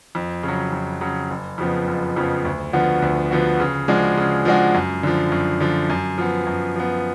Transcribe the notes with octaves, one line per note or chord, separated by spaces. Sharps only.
F2
C#3
F#3
F2
C#3 F#3
F#1
F2 C#3 F3 B3
F#1
F2 C#3 F3 B3
D2
D3 F3 B3 F#4
D2
D3 F3 B3 F#4
C#3
F3 G#3 D4 F#4
C#3
F3 G#3 D4 F#4
F#2
D3 F3
F#2
D3 F3
F#2
F3 B3
F#2
F3 B3